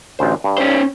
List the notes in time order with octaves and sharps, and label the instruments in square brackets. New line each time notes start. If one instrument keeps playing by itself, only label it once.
[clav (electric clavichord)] A1 D2 C5
G2
[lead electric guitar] C#4 C5